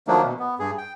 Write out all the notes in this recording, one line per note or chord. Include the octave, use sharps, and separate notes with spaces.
D#3 F3 F#3 A3 A#3 D4
B2
B3
G2 G#4
G5